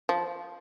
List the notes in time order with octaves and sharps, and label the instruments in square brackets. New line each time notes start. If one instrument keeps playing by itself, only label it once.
[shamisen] F3